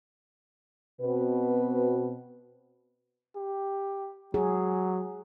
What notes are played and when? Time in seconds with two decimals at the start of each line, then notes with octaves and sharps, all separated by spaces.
1.01 B2 C4 B4
3.36 G4
4.34 F#3 G#4